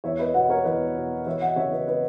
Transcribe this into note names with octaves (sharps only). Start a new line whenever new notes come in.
E2 C#5 E5
B4 D#5
B2 D#5 F#5
A#4 C#5
E2 B4 D#5
B2
E3 C#5 E5
D#5 F#5
C#3 C#5 E5
B4 D#5
B4 D#5